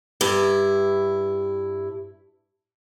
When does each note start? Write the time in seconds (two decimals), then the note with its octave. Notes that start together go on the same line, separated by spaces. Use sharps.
0.21 G2 E4